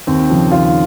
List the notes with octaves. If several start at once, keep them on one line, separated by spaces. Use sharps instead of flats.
D#2 C4
C#3 F3
D#2 F4